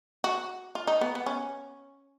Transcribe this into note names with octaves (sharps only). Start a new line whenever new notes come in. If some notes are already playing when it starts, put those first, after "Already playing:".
F#4
F4
D#4
B3
B3
C#4